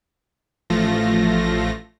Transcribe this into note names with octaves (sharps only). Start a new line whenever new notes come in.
A1 F3 A3 F4 A#6